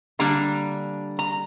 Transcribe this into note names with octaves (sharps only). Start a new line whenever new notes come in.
D3 G3 A#3 D4 A#5
A#5